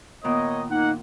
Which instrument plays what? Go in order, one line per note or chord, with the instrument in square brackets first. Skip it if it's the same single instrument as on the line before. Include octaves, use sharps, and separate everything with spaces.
[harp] A#2 D#3 B3 [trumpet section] A#4 C#5 D#5
[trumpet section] A#3 F#5 [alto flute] D#4